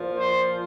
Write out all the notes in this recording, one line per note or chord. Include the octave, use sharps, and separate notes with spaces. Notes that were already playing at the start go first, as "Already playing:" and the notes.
Already playing: A#2 F3
C5